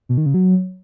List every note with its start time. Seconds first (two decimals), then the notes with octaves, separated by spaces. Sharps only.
0.09 B2
0.18 D#3
0.26 C#3
0.34 F#3